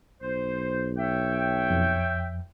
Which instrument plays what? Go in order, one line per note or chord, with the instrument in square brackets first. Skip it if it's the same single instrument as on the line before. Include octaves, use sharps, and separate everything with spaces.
[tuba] B1 [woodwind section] C5
[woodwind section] C#5 E5 G5
[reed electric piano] F2